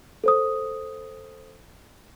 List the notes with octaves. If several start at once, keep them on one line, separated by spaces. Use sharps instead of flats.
A4 C5 D#6